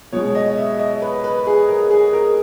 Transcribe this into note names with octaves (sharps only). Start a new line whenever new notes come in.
B2 G#3 C#5
D#5
E5
D#5
B4
B4
G#4
A#4
G#4
A#4